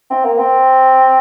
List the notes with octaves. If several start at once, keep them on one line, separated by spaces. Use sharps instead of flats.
C4
A#3
C4